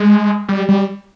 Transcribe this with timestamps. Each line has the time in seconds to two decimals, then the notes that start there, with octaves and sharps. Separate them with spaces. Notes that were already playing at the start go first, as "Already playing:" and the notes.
Already playing: G#3
0.49 G3
0.69 G3